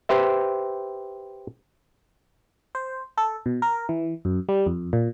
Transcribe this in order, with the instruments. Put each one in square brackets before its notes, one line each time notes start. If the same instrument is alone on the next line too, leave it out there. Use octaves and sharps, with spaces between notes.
[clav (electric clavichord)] G4 B4 C5 E5
[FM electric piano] C5
A4
B2
A#4
E3
F#2
G3
F2
A#2